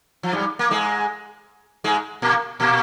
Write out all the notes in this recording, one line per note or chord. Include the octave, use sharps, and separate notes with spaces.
F3
G2 G3
A#3
G#2 G#3
G#2 G#3
A#2 A#3
A#2 A#3